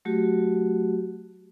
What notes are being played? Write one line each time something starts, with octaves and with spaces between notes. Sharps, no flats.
F#3 A3 F#4 G4